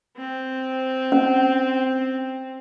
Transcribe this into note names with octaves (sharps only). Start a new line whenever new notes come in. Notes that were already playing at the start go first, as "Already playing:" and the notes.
C4
C#4